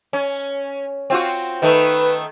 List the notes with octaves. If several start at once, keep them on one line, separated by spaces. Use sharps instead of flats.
C#4
C4 F4 F#4
D#3 A3 B4